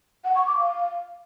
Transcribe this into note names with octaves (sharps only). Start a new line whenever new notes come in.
F#5
C#6
D6
F5